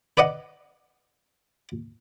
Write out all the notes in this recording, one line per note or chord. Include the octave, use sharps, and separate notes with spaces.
B4 D5 D#5 F#5